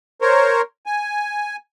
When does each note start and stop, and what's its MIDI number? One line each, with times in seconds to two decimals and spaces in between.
0.22 0.62 70
0.22 0.62 72
0.22 0.62 73
0.86 1.56 80